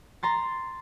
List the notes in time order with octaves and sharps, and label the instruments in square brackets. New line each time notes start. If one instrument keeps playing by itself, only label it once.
[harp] A#5 C6 A6